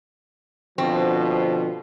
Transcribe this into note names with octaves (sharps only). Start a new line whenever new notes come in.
B2 D3 F3 C4